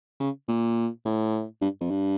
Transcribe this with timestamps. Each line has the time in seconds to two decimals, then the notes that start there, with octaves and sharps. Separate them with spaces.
0.20 C#3
0.48 A#2
1.05 A2
1.61 G2
1.81 F2
1.91 G2